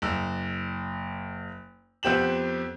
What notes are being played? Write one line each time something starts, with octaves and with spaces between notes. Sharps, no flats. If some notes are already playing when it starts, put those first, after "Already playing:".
F#1 E6
F2 B3 C4 G4 E7 F#7